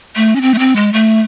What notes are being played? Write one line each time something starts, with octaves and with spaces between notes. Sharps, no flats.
A3
C#4
C4
A3
C4
G#3
A3